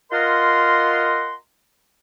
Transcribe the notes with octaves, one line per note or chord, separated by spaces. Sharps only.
F4 A#4 D#5 F#5 A#5 C6